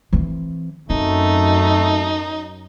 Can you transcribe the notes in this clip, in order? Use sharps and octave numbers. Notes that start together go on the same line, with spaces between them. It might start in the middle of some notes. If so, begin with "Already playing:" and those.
E3 C4
F#2 A3 C4 D#4